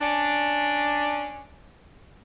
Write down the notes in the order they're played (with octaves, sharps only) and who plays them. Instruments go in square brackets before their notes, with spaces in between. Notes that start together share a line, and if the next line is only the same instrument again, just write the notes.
[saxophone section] C#4 D4